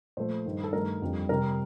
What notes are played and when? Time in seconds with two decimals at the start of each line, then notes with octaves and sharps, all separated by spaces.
0.17 A#2 F3 A3 C5
0.46 G2 D#3 A3
0.64 A4
0.73 G2 D#3 A3 A#4
1.02 F2 D3 G3
1.29 C3 G3 A#4